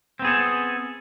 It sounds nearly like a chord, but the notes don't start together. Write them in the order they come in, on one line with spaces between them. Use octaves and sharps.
C4 B3 G#4 A4